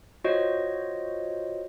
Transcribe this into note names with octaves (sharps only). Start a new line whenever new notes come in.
F4 F#4 C5 C#5 D#5